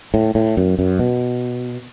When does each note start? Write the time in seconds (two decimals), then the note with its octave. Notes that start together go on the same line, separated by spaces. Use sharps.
0.14 A2
0.35 A2
0.57 F#2
0.79 F#2
0.99 B2